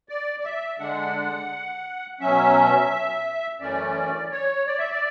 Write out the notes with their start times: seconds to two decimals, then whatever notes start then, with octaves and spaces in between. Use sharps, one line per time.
0.09 D5
0.40 D5
0.45 E5
0.80 D3 G#3 D4 F#5
2.20 B2 F#3 C#4 E5
3.61 F#2 E3 A3 C#4 D5
4.32 C#5
4.67 D5
4.78 E5
4.91 D5